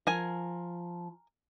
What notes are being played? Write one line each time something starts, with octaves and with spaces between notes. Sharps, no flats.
F3 A#4 G#5